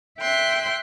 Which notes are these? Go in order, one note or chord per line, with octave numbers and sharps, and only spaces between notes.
E5 G5 C6 F#6